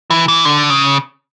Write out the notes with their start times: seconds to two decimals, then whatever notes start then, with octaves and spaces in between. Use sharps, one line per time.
0.10 E3
0.28 E3
0.45 D3
0.70 C#3